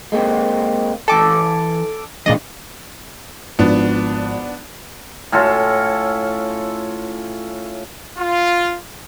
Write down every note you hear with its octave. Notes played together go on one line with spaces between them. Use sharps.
G#3 A#3 C4
E3 A4 G#5 A5 D6
A#2 E3 G#3 D4 D5 D#5
G#1 F3 B3 D4
A2 C#4 F4 A4
F4